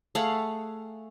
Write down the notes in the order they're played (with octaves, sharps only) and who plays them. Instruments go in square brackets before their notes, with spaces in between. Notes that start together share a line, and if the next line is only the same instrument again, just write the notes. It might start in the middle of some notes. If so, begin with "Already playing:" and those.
[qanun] A3 G#4 F5 F#5